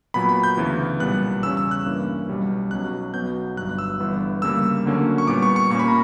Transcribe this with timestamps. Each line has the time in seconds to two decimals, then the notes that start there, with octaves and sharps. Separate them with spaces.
0.14 A#2 F#3 B3 B5
0.29 B5
0.44 G6
0.57 D2 C#3 E3 B3
1.00 B1 A#2 G3 B3 F#6
1.43 E2 C#3 G3 C#4 E6
1.57 E6
1.71 F#6
1.86 G2 E3 A#3 C#4
2.28 B1 B2 G3 C#4
2.71 B1 B2 F#3 C#4 F#6
3.14 B1 B2 F#3 B3 G6
3.57 G1 G2 F#3 F#6
3.79 E6
4.00 G1 G2 E3 B3
4.42 D2 C#3 G3 A#3 E6
4.85 D2 D3 F#3 A#3 C#4
5.18 C#6
5.27 A#2 G3 B3 D6
5.43 C#6
5.56 C#6
5.70 A#2 A#3 C#4 C#6
5.79 B5
5.88 A#5